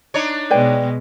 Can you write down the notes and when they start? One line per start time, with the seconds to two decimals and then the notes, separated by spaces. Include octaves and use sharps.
0.14 D4 D#4 C#5
0.51 B2 G#3 B4 D5 G5